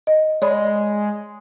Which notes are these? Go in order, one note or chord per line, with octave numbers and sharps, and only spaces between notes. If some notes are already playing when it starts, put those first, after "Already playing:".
D#5
G#3 C#5 D5 B5